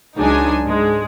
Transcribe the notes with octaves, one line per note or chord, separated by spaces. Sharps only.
C#2 F#3 G#3 D4 D#4 G#5
G#2 G#3